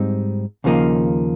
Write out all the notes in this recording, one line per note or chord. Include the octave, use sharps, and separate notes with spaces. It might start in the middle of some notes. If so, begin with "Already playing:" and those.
Already playing: G#2 G3 C4 D#4
D#2 C#3 F3 A#3 D#4